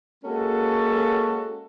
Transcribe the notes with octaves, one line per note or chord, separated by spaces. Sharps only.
G#3 A#3 C#4 F#4 A4